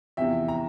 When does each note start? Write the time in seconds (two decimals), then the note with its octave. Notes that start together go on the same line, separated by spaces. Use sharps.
0.17 E2 C3 F3 E5 G5
0.48 G5 A#5